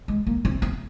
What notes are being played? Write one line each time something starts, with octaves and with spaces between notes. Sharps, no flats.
G#3
A#3
C4
C4